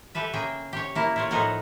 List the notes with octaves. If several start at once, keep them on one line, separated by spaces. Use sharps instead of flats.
G4 A4 B4 E5
C#3 A#3 G#4 G5
G4 C#5
A#3 E4
E4 F4 C#5
A2 F3 D#4 A4 A#4 F#5